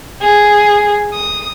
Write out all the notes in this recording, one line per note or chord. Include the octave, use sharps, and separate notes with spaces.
G#4
D#6